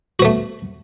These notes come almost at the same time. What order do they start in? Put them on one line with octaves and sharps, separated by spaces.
F#4 B3 A3